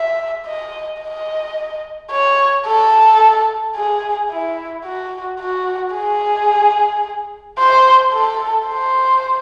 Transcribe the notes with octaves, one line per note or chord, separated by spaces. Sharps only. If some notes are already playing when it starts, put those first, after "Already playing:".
Already playing: E5
D#5
D#5
C#5
A4
G#4
E4
F#4
F#4
G#4
C5
A4
C5